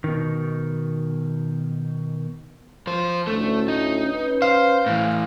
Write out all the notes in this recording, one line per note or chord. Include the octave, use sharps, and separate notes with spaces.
B2 D#3
F3 C5
D2 A2 A3 C#4
D#4
C#4 B4
C5 F5
A2 E3